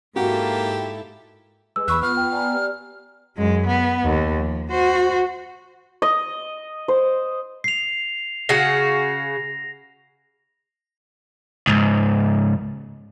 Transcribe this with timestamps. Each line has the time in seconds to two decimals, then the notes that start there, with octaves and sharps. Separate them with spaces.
0.16 G#2 A#3 E4 F#4 G4 A4
1.76 G#3 B4 E6
1.88 E2 B5 C#6 E6 F#6
2.03 B3 F4 F6
2.17 G5
2.32 D5 G#5 A#5
2.51 G4 D5
3.37 F#2 G#3
3.66 B3
4.04 D#2
4.35 F3
4.71 F#4 C5
6.02 D#5
6.88 C5
7.64 C7 F7
8.49 C#3 F#4 A#6
11.67 C#2 G#2